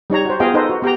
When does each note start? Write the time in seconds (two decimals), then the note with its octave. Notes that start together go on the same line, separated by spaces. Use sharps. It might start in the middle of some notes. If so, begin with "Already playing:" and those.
0.10 G3 D#4 C#5 A#5
0.25 F#4 C5
0.40 B3 F4 G#4 D#5 F5 G5
0.54 D#4 A4 B4 C5 D#5
0.70 F#4
0.82 B3 G4 G5 A#5